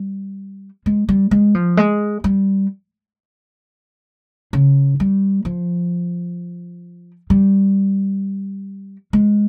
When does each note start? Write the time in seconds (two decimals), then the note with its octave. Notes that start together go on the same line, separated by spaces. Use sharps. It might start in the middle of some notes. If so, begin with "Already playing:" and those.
Already playing: G3
0.86 G#3
1.09 G3
1.31 G#3
1.55 F3
1.77 G#3
2.24 G3
4.53 C#3
5.00 G3
5.45 F3
7.30 G3
9.13 G#3